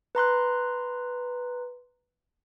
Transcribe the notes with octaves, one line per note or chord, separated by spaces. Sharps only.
B4 A#5 C6 F#6